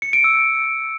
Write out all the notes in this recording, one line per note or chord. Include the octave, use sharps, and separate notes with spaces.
C#7
D7
E6